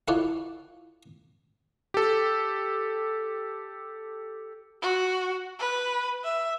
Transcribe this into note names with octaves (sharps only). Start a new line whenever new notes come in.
E4 F4 A4 C#5 D5 F#5
G4 A4
F#4
B4
E5